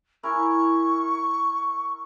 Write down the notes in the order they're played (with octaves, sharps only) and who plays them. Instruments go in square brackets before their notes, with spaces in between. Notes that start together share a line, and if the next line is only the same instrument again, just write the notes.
[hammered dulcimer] E4 A#4 G#5 [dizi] C#6